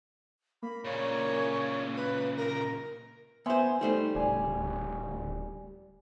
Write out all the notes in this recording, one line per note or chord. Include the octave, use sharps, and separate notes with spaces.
A#3 B5
A#2 C#3 C#5
B4
A#4
B3 C5 E5 G#5 C6
G3 A3 D#4 C5
D1 C#2 D5 G#5